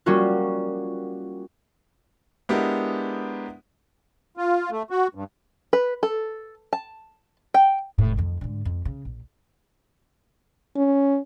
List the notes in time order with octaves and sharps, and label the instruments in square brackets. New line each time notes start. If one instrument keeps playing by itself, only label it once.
[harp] G3 A#3 C#4 F4 F#4 A#4
[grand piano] G#3 B3 D4 E4 G4 A#4
[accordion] F4
A3
F#4
G2
[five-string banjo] B4
A4
A5
G5
[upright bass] F1 A2
F2 D#3
G#2 D3
F2
C#3
A#1
[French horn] C#4